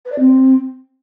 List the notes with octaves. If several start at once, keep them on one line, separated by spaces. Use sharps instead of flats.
B4
D5
C4